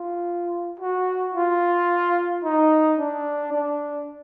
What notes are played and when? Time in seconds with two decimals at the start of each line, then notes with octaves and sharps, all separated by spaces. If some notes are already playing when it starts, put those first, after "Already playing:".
Already playing: F4
0.80 F#4
1.34 F4
2.44 D#4
2.98 D4
3.53 D4